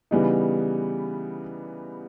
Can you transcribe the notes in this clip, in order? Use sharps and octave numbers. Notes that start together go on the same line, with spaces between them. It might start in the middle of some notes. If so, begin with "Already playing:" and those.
C#3 E3 G3 B3 D#4